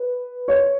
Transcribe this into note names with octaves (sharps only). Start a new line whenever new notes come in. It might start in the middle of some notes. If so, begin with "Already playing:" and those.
Already playing: B4
C#5